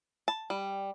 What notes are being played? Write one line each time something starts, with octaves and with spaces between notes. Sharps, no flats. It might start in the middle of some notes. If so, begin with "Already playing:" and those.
A5
G3